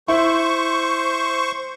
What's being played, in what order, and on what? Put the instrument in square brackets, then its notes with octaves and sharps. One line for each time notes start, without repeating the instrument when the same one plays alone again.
[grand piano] E4 [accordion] C5 C#6